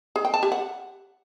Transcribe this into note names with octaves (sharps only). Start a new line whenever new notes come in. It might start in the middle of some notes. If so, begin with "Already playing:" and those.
G#4
G5
A5
G4
F#5